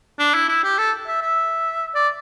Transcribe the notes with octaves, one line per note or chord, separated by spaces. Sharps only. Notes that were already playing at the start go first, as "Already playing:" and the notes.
D4
E4
E4
G4
A4
E5
E5
D5